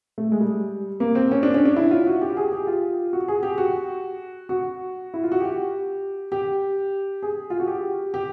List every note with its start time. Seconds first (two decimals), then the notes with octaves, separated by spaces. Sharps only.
0.18 A3
0.32 G#3
0.41 G3
1.00 A#3
1.15 C4
1.31 C#4
1.43 D4
1.54 C#4
1.65 D4
1.76 E4
1.91 F4
2.07 F#4
2.22 G4
2.37 G#4
2.52 G4
2.67 F4
3.13 F#4
3.28 G#4
3.43 G4
3.58 F#4
4.49 F#4
5.14 E4
5.23 F4
5.32 F#4
5.40 G4
6.32 G4
7.23 G#4
7.50 F4
7.60 F#4
7.67 G4
8.14 G4